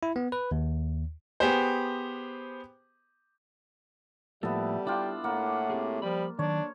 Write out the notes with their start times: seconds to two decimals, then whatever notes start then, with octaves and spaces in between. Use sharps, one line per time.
0.03 E4
0.16 B3
0.32 B4
0.51 D#2
1.40 B3 G4 G#4 C5
4.43 A2 F3 G3 A#3 B3 A4 E5
4.87 D4 E4 F4 G5
5.24 A2 A#3 F#5
5.70 C4 G4 G#4
6.02 F3 G3 B5
6.39 D#3 F#3 D4 C#5